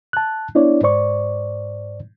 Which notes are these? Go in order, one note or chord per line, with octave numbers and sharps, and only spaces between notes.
A5 F#6
B3 D4 E4 C#5 D5
G#2 C5 D5 C#6